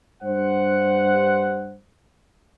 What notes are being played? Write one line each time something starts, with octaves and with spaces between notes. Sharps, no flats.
G2 C5 F#5